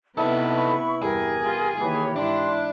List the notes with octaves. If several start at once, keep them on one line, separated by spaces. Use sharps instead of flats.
C3 B3 D#4 E4 A4 B4 A5
B5 C#6
E2 G2 G4 G#4 A#4
B3 F4
D#3 E3 A#3 G4 B4 C#5 B5
G#2 D4 E4 C6